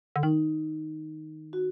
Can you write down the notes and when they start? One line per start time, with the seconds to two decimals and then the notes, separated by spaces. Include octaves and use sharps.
0.16 D3
0.23 D#3 D#4
1.53 F#4